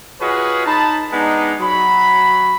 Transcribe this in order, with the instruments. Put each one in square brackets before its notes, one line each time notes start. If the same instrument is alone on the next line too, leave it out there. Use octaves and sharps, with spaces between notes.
[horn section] F4 F#4 G#4 B4 C#5 D#5
D#4 A5 B5
G#3 B3 D4 D#4
F#3 B5